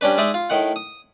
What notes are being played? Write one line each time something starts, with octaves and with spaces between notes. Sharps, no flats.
G3 C#4 D4 B4
G#3 D#4 D5 E5 D#6
F4
A2 D#3 F#5
D#6